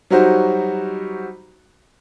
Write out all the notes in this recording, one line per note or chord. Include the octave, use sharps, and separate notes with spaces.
F#3 G3 D#4 F#4 C5